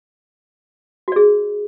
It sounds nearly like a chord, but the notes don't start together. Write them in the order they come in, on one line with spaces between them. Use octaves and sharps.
F#4 D5 G#4